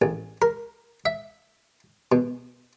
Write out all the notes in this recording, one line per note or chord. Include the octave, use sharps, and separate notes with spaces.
A1
A#4
E5
B2